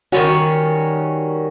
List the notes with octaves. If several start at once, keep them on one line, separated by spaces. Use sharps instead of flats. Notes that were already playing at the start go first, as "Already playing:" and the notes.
D#3 G3 C#4 F#4